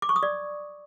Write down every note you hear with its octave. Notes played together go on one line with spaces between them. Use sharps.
D6
C#6
D#6
D5